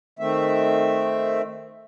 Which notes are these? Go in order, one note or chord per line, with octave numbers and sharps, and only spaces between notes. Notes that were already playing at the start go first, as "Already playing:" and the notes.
D#3 A3 C4 E5